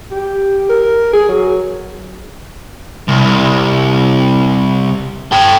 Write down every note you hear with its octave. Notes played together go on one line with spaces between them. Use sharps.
G4
A#4
G#4
F#3
C2
A4 G5